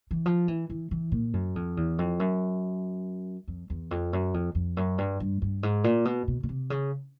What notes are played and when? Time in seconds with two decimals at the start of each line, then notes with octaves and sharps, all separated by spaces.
0.11 E3
0.26 F3
0.48 E3
0.70 E3
0.91 E3
1.12 A#2
1.33 F#2
1.56 F2
1.77 E2
1.98 F2
2.20 F#2
3.48 F2
3.70 E2
3.91 F2
4.13 F#2
4.34 F2
4.55 F2
4.77 F#2
4.98 G2
5.20 G2
5.42 G2
5.63 G#2
5.84 A#2
6.05 B2
6.28 B2
6.43 B2
6.49 C3
6.70 C#3